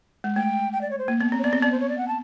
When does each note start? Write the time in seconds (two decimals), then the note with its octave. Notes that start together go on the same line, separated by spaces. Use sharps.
0.24 G#3
0.36 A3 G5
0.73 G5
0.81 D5
0.91 C#5
0.99 C5
1.08 A#3
1.21 B3
1.32 C4
1.39 C#5
1.44 B3 D5
1.53 C4
1.62 B3 D5
1.72 C5
1.80 C#5
1.89 D5
1.98 F#5
2.08 A5